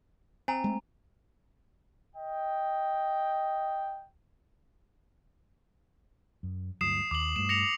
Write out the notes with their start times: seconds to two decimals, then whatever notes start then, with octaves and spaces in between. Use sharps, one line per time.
0.48 C4 G#5 A#5
0.64 G#3 A3
2.14 D#5 G5
6.43 F#2
6.81 D2 G2 F#3 D#6 C7 E7
7.11 D#2 D6 F#7
7.36 G2 G3 A3 E7
7.49 A#6 C#7 F7